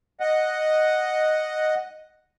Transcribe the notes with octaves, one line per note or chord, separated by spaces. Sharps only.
D#5 F#5